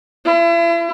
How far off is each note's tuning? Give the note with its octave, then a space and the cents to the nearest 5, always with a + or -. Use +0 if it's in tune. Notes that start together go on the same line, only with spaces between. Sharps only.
E4 +40